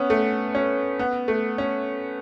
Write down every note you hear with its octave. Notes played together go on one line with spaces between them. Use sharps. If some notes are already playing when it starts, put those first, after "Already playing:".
Already playing: B3 C#4
A3
C#4
B3
A3
C#4